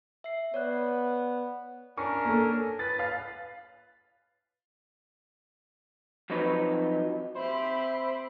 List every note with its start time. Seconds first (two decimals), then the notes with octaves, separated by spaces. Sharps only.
0.24 E5 C7
0.54 B3 C#5 D5 F#6
1.98 C#4 D4 A#4 C#6
2.25 A#3 A4
2.79 B4 A6
2.99 F5
6.30 F3 F#3 C4 D#4 B4 C#5
7.35 C4 G4 C5 E5 B5